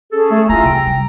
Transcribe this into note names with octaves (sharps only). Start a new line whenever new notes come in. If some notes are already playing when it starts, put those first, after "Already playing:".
C#4 G#4 A4 A5
A3
E4 F4 G#5 A#5 E6
C3 G#3 G5
G3